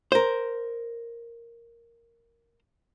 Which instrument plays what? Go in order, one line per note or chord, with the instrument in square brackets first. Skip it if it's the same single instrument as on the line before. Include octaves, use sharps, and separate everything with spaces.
[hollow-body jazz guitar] A#4 C5